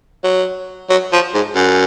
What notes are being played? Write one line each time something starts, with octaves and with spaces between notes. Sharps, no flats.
F#3
F#3
F3
G#2
F#2